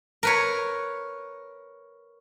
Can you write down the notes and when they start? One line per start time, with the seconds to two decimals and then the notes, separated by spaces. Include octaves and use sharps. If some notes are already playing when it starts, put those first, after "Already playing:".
0.23 A#4 B4 C#5